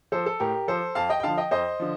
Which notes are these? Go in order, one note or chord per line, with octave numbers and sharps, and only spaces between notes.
F3 A4 C5
A4
A2 G4 A#4
F3 A4 C5
F2 F5 A5
D#5 G5
G5
D3 F3 F5 A5
D#5 G5
F2 C5 D#5
D3 F3